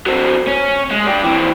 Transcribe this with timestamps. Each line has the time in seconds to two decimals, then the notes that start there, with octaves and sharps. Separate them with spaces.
0.06 F#3 C4
0.47 C#4
0.91 G#3
1.07 D4 G4
1.24 E3 C4